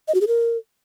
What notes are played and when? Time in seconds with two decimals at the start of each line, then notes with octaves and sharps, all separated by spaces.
0.08 D#5
0.14 F#4
0.21 G#4
0.28 A#4